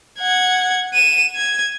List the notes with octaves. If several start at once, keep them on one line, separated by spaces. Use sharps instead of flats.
F#5 G#6
D#7 E7
G#6